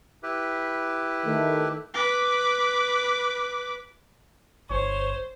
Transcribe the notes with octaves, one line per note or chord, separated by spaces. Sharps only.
E4 G4 B4
D#3 A3
B4 D6
G1 C5 C#5